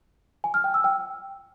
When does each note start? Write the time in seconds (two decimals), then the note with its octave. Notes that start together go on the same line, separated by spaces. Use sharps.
0.44 G#5
0.54 F6
0.64 G5
0.74 E6
0.84 G5